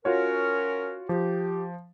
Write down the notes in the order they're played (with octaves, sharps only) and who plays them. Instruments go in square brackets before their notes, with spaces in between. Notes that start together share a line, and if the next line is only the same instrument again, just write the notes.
[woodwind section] C#4 A#4 [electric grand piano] F4 F#4 C#5
[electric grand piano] F3 [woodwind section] G4